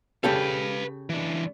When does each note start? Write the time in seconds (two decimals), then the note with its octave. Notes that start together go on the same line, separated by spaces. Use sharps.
0.24 C#3 G4 A4 B4 F5
1.10 E3 D4